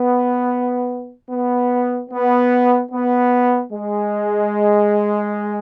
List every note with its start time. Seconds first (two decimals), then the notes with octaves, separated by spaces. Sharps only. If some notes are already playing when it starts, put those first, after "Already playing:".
Already playing: B3
1.30 B3
2.10 B3
2.91 B3
3.71 G#3